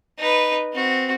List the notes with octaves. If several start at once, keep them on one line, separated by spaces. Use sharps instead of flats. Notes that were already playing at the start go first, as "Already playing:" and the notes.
D#4 B4
C4 F#4